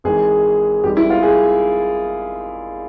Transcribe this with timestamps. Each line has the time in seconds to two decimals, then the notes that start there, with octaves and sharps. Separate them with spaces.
0.04 G#1 G#2 E3 G#3 G#4
0.83 G#1 G#2 G3 G4
0.97 E4
1.10 F4
1.23 G#4